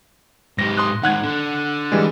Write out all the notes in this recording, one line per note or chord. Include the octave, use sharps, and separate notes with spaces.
G#2 G4 A#6
C6 D#6 F#6
G#2 D#3 F#5 F#6 G#6
D3
E3 G3 G#3